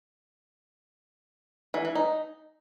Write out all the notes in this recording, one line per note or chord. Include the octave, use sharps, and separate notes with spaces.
E3
E3
D#4